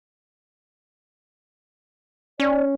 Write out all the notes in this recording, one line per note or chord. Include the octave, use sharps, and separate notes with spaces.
C#4 D5